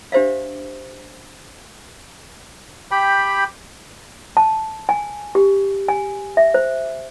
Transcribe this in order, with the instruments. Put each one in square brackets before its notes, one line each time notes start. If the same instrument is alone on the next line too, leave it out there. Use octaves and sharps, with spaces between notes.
[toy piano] D4 G4 C5 E5 F5
[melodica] G4 G5 B5
[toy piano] A5
G#5
G4
G#5
E5
C5